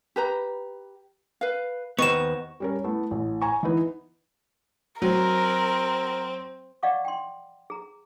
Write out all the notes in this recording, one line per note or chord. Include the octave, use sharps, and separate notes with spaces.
G4 B4 A#5
B4 F5
D#2 B3 C5 D#5 C#6 E7
G3 C#4 A#4
A3 B3 E4
A1
G#5 A#5 C#6
E3 B3 D#4 E4 B4
F#3 C4 A#4
D5 D#5 F5 F#5 C#6 D6
G5 C6
G#4 A#5